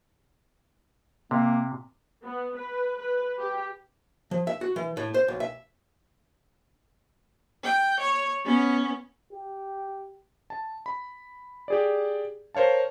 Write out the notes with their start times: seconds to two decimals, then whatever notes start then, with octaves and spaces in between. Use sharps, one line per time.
1.31 C3 A#3
2.23 B3
2.57 B4
2.98 B4
3.40 G4
4.31 F3
4.47 E5
4.61 F#4
4.76 E3
4.97 A2
5.14 C5
5.28 B1
5.40 E5
7.63 G5
8.00 C#5
8.45 B3 C#4
9.32 G4
10.50 A5
10.86 B5
11.68 G4 G#4 D5
12.55 A#4 C5 C#5 F5 A5